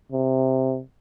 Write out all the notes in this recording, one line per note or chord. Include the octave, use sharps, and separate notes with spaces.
C3